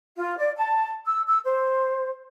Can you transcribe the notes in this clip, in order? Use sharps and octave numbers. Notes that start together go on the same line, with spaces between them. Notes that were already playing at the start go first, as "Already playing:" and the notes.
F4
D5
A5
E6
E6
C5